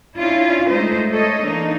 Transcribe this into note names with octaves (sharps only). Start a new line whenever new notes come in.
C#4 D4 E4 F4
G#3 A3 D#4 C5 D#5
A4 C#5 D#5
E3 A#3 D4 D#4